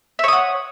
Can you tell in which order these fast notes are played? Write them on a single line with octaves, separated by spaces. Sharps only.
E5 C#5 D#6 F#5